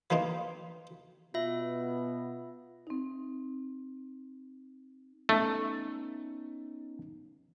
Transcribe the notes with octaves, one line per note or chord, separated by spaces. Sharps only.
E3 A#3 C4 D#4
B2 B3 F4 E5
C4 D#4
A3 B3 C#4 D#4